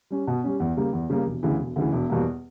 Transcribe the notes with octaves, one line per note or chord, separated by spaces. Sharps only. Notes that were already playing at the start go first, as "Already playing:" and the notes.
G3 C#4
B2
G3 C#4
E2
C#3 G3 A#3
E2
C#3 G3 A#3
E1
D2 C#3 E3
E1
D2 C#3 E3
E1
E2 B2 G3 A#3